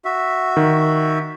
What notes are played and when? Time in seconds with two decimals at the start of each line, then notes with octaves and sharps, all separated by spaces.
0.05 F#4 E5
0.57 D#3